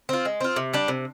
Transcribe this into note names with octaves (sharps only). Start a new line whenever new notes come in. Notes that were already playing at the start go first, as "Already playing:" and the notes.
C4 F4
G#3
C4 F4
C3
G3 D4
C3